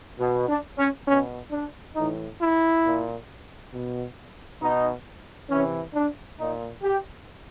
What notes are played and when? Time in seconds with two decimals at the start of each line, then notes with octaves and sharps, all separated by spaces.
0.19 B2
0.48 D4
0.78 C#4
1.07 B2 C#4
1.51 D4
1.96 A2 E3 D#4
2.40 E4
2.84 A#2
3.74 B2
4.61 B2 D#4
5.50 C3 E3 C#4
5.95 D4
6.39 A#2 D#4
6.83 G4